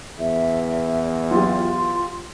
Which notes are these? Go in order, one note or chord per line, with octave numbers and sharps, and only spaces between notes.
E2 E5
F#3 F4 G4 C6